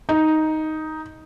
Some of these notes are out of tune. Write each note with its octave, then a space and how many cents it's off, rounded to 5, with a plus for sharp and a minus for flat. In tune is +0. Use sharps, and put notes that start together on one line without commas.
D#4 +5